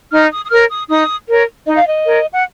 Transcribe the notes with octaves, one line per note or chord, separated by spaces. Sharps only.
D#4 F6
D#6
D#6
A#4 C#5 F6
D#6
D#4 D#6
A#4 C#5
D#4 D#5
F5
D#5
A#4 C#5
F#5